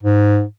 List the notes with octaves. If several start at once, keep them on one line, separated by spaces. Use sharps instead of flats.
G#2